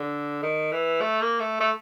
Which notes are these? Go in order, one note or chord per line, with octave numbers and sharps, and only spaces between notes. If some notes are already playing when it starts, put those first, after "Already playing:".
Already playing: D3
D#3
E3
A3
A#3
A3
A3